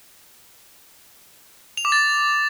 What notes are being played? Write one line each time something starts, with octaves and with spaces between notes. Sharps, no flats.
F7
D6
A6